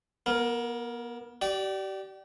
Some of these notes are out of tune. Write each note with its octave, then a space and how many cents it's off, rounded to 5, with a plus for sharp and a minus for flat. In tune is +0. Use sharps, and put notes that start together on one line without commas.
B3 -40 A#4 +0
G4 -35 D5 +0